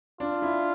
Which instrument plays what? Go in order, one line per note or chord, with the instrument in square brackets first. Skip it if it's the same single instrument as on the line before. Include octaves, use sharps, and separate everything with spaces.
[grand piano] D4 [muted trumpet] F4
[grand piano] E4